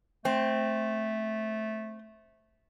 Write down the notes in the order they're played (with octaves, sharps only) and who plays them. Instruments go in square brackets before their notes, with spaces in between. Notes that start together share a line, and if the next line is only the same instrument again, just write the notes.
[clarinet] A3 [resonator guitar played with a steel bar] C4